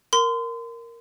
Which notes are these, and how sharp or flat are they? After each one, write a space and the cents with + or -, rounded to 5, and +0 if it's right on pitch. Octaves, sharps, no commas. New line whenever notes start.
A#4 +0 C6 -35